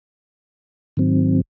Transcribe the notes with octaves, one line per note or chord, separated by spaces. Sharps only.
G#2 D#3 F#3 C4